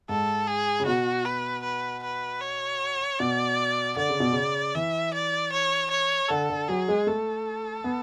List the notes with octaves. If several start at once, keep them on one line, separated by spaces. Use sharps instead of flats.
G#2 A4
G#4
C#3
B2 F#4
B4
B4
B4
C#5
B2 D5
D3 D5
C#3
B2
C#3
E3 E5
D5
C#5
C#5
D3 A4
D3
F#3 G#4
G#3
A3 A4
B3